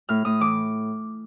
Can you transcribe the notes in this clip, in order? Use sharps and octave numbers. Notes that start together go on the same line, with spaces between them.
A2 F6
A2 D#6
E3 D6